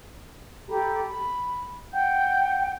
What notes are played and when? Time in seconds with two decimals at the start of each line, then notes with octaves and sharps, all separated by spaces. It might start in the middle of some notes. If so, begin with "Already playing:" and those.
0.69 G4 A4 A#5 B5
1.07 B5
1.92 F#5 G5 G6